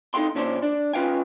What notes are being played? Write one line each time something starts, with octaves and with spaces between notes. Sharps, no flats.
C4 D#4 A4 F5 G5 C6
A#2 C#4 D4 A4 C5
D4
C#4 F4 B4 F5 G5 G#5